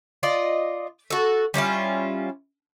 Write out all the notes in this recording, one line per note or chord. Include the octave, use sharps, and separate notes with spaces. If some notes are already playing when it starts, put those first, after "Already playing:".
F4 D5 D#5
F#4 A4
G3 C#4 E4 F4